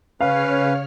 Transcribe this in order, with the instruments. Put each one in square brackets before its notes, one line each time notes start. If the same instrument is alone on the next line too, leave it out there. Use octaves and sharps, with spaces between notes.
[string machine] C#3 C#5 F6 [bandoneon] C#4 B4 [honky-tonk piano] F5